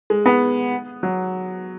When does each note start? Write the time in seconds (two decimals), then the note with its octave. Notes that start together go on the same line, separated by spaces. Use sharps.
0.10 G#3
0.26 B3
1.03 F#3